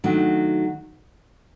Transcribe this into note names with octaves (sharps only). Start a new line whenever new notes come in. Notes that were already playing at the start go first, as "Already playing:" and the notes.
D#3 F#3 A3 D4